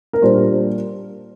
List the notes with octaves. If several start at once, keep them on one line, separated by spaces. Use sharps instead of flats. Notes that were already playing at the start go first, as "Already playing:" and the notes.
A#4
A#2 G3 A#3 D4 C5